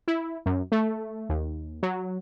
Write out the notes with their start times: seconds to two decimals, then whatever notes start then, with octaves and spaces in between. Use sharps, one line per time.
0.08 E4
0.46 F#2
0.72 A3
1.29 D#2
1.83 F#3